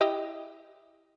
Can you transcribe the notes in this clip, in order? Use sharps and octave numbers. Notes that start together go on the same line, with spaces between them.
E4 G4 D#5